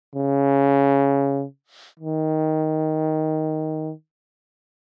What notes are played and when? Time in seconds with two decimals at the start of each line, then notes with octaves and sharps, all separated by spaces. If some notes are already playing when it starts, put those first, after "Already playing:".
0.15 C#3
2.00 D#3